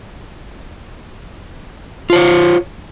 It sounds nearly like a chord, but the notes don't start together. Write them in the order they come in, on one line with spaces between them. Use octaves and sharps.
F4 C5 C#5